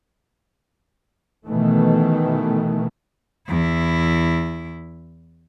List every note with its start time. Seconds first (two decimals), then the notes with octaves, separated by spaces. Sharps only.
1.46 B2 D#3 E3 A3
3.48 E2 E4